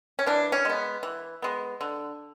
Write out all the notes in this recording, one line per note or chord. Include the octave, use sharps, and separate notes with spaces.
C#4
E3 D4
C#4
G#3 B3
E3
G#3 B3
D3